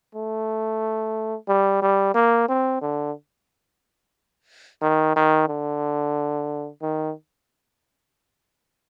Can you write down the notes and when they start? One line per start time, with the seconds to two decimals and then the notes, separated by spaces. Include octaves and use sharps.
0.15 A3
1.48 G3
1.82 G3
2.15 A#3
2.49 C4
2.82 D3
4.82 D#3
5.16 D#3
5.48 D3
6.82 D#3